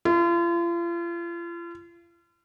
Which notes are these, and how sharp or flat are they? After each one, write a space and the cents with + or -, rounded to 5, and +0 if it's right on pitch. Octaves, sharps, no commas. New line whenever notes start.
F4 -40